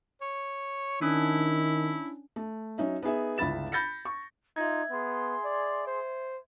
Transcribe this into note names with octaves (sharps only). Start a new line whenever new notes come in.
C#5
D#3 C#4 D4 E4
A3
F#3 C#4 D#4 E5
B3 D#4 G#4 E5
G1 C#2 E4 B5 A6 E7
B5 G6 A6 A#6 C#7
C#6
D#4 F4 E5 G#6
B3 G#4 C6
D5
C5